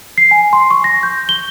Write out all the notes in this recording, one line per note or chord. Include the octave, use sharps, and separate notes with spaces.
C7
G#5
C6
C#6
A#6
G6
G7